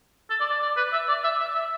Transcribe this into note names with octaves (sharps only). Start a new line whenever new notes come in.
A4
D5
D5
D5
B4
E5
D5
E5
E5
E5